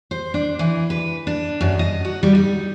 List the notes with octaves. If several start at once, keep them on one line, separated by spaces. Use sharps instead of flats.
C5
D4
E3
B4
D4
F#2
D#5
F#4
G3
D#4